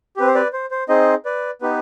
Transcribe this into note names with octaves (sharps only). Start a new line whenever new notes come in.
C4 G4 B4
C5
B4 D5
C5
C5
C4 D#4 G#4 C5 D#5
B4 D5
B3 D#4 G4 B4